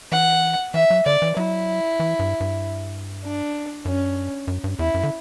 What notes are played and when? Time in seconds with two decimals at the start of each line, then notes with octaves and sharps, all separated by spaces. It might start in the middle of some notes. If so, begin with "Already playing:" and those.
0.12 E3 F#5
0.74 E3 E5
0.90 F#3
1.06 D3 D5
1.22 E3
1.37 F#3 E4
2.00 E3
2.19 G2
2.40 G2
3.24 D4
3.85 F#2 C#4
4.47 F#2
4.64 G2
4.79 E2 E4
4.94 F#2
5.03 D3